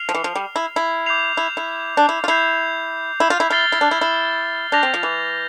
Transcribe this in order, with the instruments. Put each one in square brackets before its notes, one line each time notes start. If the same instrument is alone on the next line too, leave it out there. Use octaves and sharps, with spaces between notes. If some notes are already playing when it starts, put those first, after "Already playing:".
Already playing: [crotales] F6 C7 F7
[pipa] F3
E3
F3
G3
E4
E4
[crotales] D6 G6 C7 F7
[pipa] E4
E4
D4
E4
F4
[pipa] E4 [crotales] G6 C7 F7
[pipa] E4
F4
E4
[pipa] E4 [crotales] F6 A6 C7 G7
[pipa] E4
D4
E4
E4
[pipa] D4 [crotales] G6 A#6 F7
[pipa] C4
F3
E3